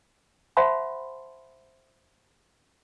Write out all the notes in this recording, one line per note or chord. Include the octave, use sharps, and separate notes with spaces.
C5 E5 F#5 A5 B5 C6